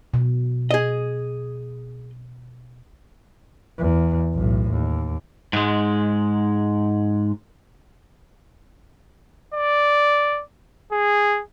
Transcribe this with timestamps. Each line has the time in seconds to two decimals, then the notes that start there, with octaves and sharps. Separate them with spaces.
0.14 B2
0.71 G#4 D#5
3.78 E2
4.34 B1 A2
4.72 D#2
5.53 G#2 G#3
9.54 D5
10.92 G#4